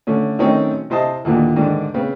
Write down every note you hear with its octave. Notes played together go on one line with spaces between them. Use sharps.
D3 A3 C#4
D#3 F#3 A3 C4 C#4 D#4
C3 E4 C5 D#5 A5
D#2 A#2 D3 E3
G#2 D3 D#3 D4
C#3 B3 C4